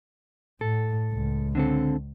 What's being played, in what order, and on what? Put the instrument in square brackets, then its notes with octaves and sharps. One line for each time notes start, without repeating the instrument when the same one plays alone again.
[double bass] A2 [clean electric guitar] A4
[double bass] C#2
[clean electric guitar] D3 C4 A4